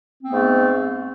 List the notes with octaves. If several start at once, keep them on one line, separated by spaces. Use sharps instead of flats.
G#2 A3 B3 C4